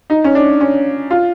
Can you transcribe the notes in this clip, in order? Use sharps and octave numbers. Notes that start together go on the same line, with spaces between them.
D#4
C#4
D4
C#4
F4